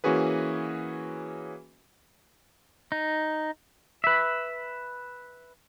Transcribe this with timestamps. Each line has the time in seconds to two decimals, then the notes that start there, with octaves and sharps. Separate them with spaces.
0.04 E3 A#3 C#4 F#4 G#4 B4
2.92 D#4
4.04 B4 E5